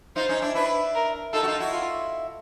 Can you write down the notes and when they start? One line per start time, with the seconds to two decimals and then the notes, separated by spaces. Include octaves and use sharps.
0.16 D#4 F4 C5
0.29 C#4 D#4
0.42 D4 E4
0.55 D4 E4 B4
0.95 A#4
1.33 D#4 F4 A4
1.43 F#4
1.47 D#4 F4
1.59 E4 F#4
1.73 F4